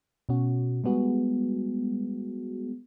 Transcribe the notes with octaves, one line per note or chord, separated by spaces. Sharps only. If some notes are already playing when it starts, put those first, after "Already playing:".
B2 C#4 F#4
G3 G#3 B3 F#4 G#4